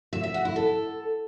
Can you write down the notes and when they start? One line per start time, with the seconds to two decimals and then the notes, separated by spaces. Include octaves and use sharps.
0.13 E5
0.23 E5
0.34 F#4
0.45 E4
0.56 A4